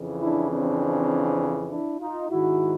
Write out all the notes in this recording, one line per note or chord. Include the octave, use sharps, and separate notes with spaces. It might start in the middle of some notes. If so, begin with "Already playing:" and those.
Already playing: F2 C#3 E3
D4 E4
C4 D4
D4 E4
D#4 F4
G#2 D#3 E4 F#4